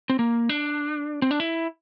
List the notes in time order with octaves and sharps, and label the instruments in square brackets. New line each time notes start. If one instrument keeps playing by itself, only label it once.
[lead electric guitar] C4
A#3
D4
C4
D4
E4